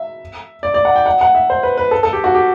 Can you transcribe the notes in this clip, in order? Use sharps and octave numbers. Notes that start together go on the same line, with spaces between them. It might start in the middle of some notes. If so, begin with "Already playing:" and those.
Already playing: E5
D5
D5
F#5
G5
F#5
F#5
E5
C5
B4
B4
A4
A4
G4
F#4
G4